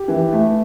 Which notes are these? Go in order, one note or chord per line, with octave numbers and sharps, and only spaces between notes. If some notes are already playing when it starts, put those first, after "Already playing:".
Already playing: G4
E3
A3